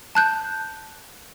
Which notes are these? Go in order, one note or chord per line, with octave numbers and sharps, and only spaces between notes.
A5 F#6 G6